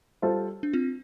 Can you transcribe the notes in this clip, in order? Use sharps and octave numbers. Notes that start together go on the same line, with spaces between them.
G3 F4 A4 C5
D4
C4 F4